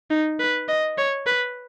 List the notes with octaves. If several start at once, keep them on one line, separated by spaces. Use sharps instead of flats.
D#4
B4
D#5
C#5
B4